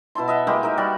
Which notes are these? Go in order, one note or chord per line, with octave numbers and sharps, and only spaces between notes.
B2 E4 A5 C6
D#5 E5 F#5
G#3 A#3 E4 G4
D#4 A#4 E5
G3 F#4 D5